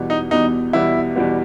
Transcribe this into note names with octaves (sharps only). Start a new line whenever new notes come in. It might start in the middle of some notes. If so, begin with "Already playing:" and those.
Already playing: E2 B2 G3 B3
D#4
E2 B2 G3 B3 D#4
E2 B2 G3 B3 E4
E2 B2 G3 B3